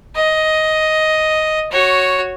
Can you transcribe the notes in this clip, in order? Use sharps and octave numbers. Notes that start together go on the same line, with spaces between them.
D#5
F#4 C#5